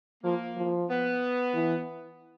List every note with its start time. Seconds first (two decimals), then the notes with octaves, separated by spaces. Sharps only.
0.24 F3 A#3
0.57 F3
0.89 B3
1.55 E3